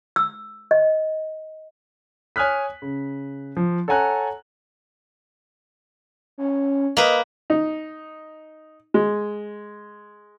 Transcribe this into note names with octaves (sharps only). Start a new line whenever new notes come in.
E6
D#5
C#5 G#5 D#6 F6 F#6 B6
C#3
F3
A4 C#5 F#5 G#5 A#5 F#6
C#4
A#3 B4 D#5
D#4
G#3